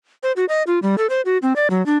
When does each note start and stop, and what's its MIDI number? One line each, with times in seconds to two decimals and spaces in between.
0.23 0.32 72
0.36 0.45 66
0.49 0.63 75
0.67 0.79 65
0.82 0.95 55
0.98 1.07 69
1.10 1.21 72
1.25 1.38 66
1.42 1.53 60
1.56 1.68 74
1.70 1.84 54
1.86 1.97 62